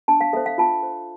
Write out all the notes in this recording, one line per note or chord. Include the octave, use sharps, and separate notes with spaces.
D4 A5
F5
A4 C5 E5
F5
F4 A5
C5